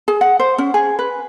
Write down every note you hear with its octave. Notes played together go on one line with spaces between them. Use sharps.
G#4
F#5
C5
C#4
G#4
B4